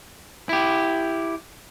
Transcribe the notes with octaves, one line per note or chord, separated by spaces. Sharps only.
E4 G4